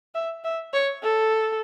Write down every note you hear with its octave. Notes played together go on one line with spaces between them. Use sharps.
E5
E5
C#5
A4